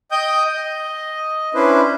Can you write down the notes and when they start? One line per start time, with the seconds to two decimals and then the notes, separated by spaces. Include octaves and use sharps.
0.11 D#5 G5 D#6 G6
0.54 D#5
1.54 C#4 D4 E4 B4 C5